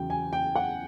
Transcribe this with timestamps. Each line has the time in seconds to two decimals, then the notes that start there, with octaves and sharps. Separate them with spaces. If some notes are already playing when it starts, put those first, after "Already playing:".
Already playing: E2 C#3 F#3 G5
0.10 G#5
0.33 G5
0.56 F#5